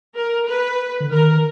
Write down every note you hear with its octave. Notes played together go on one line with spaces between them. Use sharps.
A#4
B4
D3
D#3 A#4